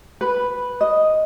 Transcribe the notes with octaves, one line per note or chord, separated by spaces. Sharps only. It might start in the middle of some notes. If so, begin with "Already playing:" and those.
B4
D#5